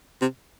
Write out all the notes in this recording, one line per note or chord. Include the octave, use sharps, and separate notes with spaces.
C3